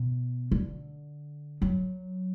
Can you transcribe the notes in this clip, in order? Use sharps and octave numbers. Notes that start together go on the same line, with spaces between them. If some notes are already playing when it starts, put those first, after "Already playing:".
Already playing: B2
D3
F#3